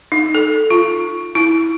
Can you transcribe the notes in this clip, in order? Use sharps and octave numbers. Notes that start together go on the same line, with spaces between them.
D#4
A4
F4
E4